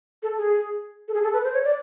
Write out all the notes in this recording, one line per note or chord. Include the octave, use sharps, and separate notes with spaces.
A4
G#4
A4
G#4
A4
B4
C5
C#5
D5